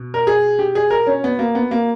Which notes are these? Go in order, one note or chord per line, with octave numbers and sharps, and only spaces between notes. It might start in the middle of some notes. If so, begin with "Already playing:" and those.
Already playing: B2
A#4
G#4
G4
G#4
A#4
C#4
B3
A#3
B3
A#3